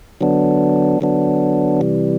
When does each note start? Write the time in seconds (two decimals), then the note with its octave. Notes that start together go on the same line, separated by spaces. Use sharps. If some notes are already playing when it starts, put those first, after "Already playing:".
0.21 D3 F#3 B3 D4
1.01 D3 F#3 B3 D4
1.81 C3 E3 G3